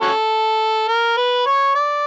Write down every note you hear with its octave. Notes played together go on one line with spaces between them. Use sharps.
C#4 F#4 A4
A#4
B4
C#5
D5